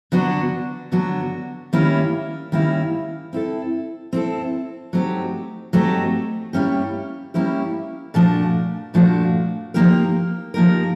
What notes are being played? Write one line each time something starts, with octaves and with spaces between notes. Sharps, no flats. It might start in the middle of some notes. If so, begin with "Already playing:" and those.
D3 F#3 B3 D4 F#4
D3 F#3 B3 D4 F#4
D#3 G3 A#3 C#4 E4
D#3 G3 A#3 C#4 E4
C4 E4 A4
C4 E4 A4
F#3 A3 C4 D#4 G4
F#3 A3 C4 D#4 G4
G3 A#3 C#4 E4 G4
G3 A#3 C#4 E4 G4
A#2 F3 A3 D4 F#4
A#2 F3 A3 D4 F#4
F3 A#3 D#4 G4 A#4
F3 A#3 D#4 G4 A#4